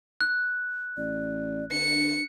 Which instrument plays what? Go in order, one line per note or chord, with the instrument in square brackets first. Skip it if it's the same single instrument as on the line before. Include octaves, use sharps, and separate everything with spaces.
[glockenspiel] F#6
[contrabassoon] A1 [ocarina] D5
[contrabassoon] D3 [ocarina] D4 [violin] C#7